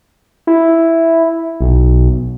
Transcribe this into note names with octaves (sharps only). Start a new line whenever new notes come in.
E4
B1